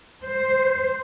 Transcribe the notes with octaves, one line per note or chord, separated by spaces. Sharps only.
C5